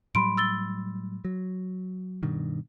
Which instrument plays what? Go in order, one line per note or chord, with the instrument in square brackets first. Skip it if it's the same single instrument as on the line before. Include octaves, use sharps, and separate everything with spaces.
[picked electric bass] A2 F#3 G3 [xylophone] B5 C6 D7
[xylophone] E6 A6 G7
[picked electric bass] F#3
G2 B2 D#3